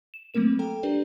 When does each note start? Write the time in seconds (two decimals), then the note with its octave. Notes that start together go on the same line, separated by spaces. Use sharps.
0.14 E7
0.34 F#3 A3 A#3 C4 A#4 E7
0.59 A4 G5 A#5
0.83 D4 G4 A#4 B4 D5